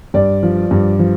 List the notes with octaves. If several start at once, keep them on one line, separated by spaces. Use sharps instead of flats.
G2 D5
F3
G2
F3